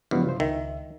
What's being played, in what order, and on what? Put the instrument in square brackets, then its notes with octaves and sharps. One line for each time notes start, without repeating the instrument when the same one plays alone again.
[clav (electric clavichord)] G2 [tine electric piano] C#3 F#3 G#3 [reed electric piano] F3 B3 E4
[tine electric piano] C3 [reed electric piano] F4 C5
[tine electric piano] C#2 [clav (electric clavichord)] D#3 [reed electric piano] E5